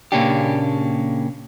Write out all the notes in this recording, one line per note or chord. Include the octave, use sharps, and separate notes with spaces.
A#2 C#3 A#3 C#4 D4 G4